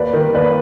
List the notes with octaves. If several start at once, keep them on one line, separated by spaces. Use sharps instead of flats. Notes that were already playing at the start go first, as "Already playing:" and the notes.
Already playing: D#2 B4 D5
D#3
D#2 B4 D5